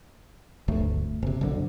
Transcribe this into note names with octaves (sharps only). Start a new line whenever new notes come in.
D1 G1 D2 A3
F#1 C3
F#1 B1 D3